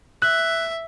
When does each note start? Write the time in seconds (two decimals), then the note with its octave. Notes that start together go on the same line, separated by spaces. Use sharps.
0.22 E5 F#6